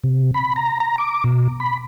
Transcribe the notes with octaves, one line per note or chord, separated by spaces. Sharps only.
C3
B5
A#5
A#5
D6
B2
B5